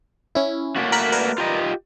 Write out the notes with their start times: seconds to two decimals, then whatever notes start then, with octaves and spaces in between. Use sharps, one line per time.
0.35 C#4 E4
0.76 A3 A#3 F#4
0.92 A#4 B5 F#6
1.12 A#4 B4 D5
1.38 F4 G4 D#5